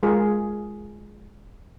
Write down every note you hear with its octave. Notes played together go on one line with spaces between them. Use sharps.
G#3 F4 G#4 A#4